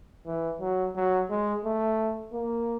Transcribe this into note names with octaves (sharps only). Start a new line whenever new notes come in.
E3
F#3
F#3
G#3
A3
A#3